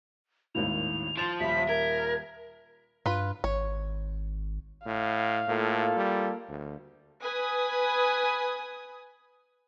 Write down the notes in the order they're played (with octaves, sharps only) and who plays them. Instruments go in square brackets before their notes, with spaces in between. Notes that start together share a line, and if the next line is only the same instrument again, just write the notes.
[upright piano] G#1 D#2 A2 [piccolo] F7
[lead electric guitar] F3 [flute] C6 [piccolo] A6 [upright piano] E7 F7
[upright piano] D#1 B5 [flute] E5 [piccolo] B6
[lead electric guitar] A#4 [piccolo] G#6
[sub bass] G2 [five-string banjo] F4 B4
[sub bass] G#1 [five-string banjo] C#5
[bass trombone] A2 [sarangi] F5
[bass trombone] A2 [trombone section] A#3 F4 A4
[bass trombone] G3
D2
[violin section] B4 G#5 D#6